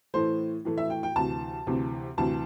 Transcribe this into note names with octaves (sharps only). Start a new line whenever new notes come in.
A2 E3 A3 C5
A2 E3 A3
E5
G5
G5
D2 C3 E3 A5
D2 C3 E3
D2 C3 E3 A5